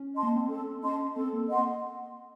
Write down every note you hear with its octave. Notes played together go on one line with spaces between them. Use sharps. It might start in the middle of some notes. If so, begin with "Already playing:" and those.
Already playing: C#4
D#5 A5 C6
A#3
C4
C#4 A4
C#4 D#5 A5 C6
C4 A4
A#3
A#3 D#5 F#5 C6